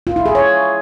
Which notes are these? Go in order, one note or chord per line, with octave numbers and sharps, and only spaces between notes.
F4
E4
G#4
C#5